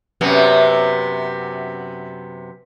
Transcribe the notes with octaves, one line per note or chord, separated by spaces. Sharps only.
F#2 C3 B3